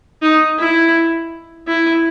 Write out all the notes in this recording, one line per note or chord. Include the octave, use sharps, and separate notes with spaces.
D#4
E4
E4